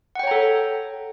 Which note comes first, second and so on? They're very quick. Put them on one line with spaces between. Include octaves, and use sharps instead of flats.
F#5 G5 C#5 A#5 A4